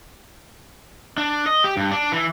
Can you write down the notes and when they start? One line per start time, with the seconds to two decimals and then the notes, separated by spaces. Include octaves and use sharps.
1.18 D4
1.46 D#5
1.64 G4
1.77 G2
1.92 D4
2.12 E3